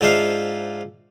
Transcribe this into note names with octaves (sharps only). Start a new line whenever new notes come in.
G#2 F3 D4 D#4 E5 F5